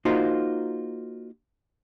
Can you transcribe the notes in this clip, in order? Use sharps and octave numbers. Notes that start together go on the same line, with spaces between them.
A#3 D#4 F4 F#4 C5